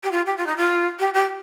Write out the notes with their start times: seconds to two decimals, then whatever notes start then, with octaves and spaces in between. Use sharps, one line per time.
0.03 G4
0.11 F4
0.26 G4
0.37 F4
0.47 D#4
0.57 F4
0.99 G4
1.14 G4